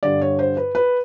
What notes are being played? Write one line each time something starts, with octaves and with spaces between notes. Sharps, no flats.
G2 D3 D5
C#5
C5
B4
B4